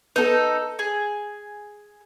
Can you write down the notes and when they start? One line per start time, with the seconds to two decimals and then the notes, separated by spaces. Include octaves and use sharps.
0.16 B3 D#4 A4 B4
0.79 G#4